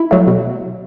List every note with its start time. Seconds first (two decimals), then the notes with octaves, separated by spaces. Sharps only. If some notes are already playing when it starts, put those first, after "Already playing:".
Already playing: E4
0.11 F#3 A3
0.27 B2